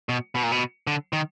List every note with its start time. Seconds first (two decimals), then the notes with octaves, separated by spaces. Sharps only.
0.09 B2
0.35 B2
0.43 A#2
0.52 B2
0.87 D3
1.13 D#3